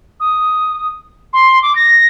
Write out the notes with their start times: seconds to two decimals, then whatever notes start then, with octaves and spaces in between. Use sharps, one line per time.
0.20 D#6
1.33 C6
1.62 D6
1.75 A#6